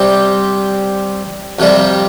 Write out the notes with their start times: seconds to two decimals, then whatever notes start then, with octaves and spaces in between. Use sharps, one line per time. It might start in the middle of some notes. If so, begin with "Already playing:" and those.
Already playing: C3 G3 C4 G4
1.59 F2 C3 G3